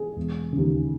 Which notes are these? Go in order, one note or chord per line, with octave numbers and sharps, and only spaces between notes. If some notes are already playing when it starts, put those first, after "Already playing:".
Already playing: G#4
E1
D#2 C#3